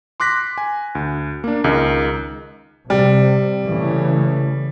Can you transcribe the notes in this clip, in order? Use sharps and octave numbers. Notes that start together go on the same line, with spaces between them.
C6 D6 F#6 A#6 B6
G#5
D2
A#3 D4
C#2 D#3 G#3 D#4 A#4
C3 G3
C#3 E3 A3